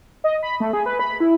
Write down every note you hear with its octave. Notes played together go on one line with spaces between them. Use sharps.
D#5
B5
A3
G#4
B4
B5
E4